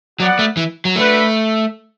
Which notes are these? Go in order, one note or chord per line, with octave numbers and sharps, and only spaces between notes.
F#3 B3 F#4 D5 F#5
A3
E3
F#3
A3 D4 F#4 B4